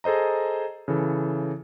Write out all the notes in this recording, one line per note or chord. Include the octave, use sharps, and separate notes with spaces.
G#4 A4 C5 D#5 A#5
C#3 E3 A4